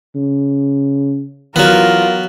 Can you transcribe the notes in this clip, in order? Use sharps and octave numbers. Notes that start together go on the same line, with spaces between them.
C#3
E3 F#3 B3 F4 A#4